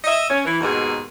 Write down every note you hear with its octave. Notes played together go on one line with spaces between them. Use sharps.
D#5 E5
C#4
E3
D#2 G#2 B2 G#4